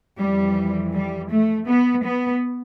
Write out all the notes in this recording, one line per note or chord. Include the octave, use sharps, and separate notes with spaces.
F2 E3 G3
G3
A3
B3
B3